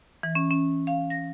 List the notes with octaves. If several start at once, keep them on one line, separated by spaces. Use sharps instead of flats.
E3
C#4
C#4
F5
A#6